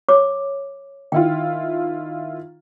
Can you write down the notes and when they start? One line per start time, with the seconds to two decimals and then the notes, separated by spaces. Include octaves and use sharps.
0.09 C#5 D6
1.12 D#3 E4 F4 G5